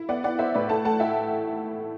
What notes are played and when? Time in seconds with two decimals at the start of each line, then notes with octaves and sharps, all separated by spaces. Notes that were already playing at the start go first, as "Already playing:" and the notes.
Already playing: E4
0.09 B3 D5 F#5
0.24 B3 D5 F#5
0.39 B3 C5 E5
0.54 A2 B4 D5
0.69 A3 F#5 A5
0.85 A3 F#5 A5
1.00 E4 E5 G5